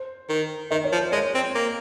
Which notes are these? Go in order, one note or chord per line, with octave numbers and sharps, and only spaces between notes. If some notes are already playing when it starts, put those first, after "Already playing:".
Already playing: C5
D#3
D#3 D#5
C#5
F3
C5
G#3 A#4 C#5
C4
A#3